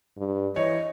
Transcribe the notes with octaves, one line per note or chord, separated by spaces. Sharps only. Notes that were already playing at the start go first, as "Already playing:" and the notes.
G2
E3 C#5 D#5